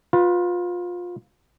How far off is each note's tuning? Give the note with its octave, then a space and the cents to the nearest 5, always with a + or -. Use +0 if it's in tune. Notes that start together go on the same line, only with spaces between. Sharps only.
F4 +25 B4 +0